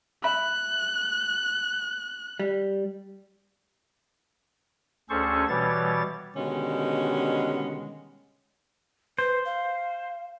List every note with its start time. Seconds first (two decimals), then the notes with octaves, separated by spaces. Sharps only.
0.24 E5 B5 F#6
2.40 G3
5.10 D2 C#4 G#4 A4 C5 C#6
5.48 B2 E3 G3 C#5 A6
6.36 B2 D3 D#3 G3 G#3 C#4
9.19 B4 C5
9.45 F5